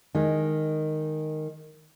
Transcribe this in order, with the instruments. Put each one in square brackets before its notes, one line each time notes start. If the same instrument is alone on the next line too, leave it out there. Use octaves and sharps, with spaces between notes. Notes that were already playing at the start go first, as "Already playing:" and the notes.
[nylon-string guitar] D#3 G#3